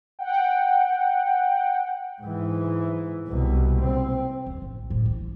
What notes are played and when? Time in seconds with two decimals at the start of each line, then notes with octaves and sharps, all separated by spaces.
0.19 F#5 G5
2.22 G#2 E3
3.27 C2 B2
3.81 C4
4.46 D#2
4.61 A1
4.90 A2
5.06 E3